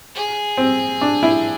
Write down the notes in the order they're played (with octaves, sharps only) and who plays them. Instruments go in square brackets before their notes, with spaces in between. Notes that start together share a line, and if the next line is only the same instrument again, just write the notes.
[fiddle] G#4
[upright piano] C4
D4
E4